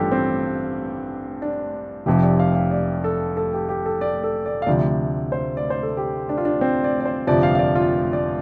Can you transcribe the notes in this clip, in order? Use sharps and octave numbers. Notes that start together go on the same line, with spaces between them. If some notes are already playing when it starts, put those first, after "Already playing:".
Already playing: A1 G2 F3 F4 G4 A4
C4
D4
F1 F2 C3 G4
D5
F5
F5
D5
A4
A4
G4
G4
A4
D5
A4
D5
F5
D2 C3 F3 D5
C5
D5
C5
A4
G4
D4
F4
D4
C4
D5
D5
C5
G1 F2 C3 F3 D5
F5
F5
D5
F4
D5